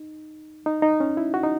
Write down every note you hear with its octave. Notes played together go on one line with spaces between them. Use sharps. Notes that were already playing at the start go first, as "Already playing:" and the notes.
Already playing: D#4
D#4
D#4
C#4
E4
F#4
D#4